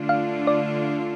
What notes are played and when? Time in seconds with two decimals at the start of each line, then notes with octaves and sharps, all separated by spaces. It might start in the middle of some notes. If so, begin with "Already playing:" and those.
Already playing: D3 A3 D4 F4
0.09 F5
0.47 D5